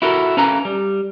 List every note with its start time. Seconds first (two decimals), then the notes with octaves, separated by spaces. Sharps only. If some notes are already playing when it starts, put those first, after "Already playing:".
0.02 E4 F#4 A4 A#4
0.37 C#4 A4 B4 F5 A#5
0.65 G3